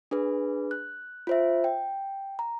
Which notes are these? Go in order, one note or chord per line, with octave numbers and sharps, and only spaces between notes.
D4 G#4 B4
F#6
F4 C5 E5
G5
A#5